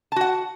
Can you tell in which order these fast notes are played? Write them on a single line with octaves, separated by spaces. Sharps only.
A5 F#4 F#5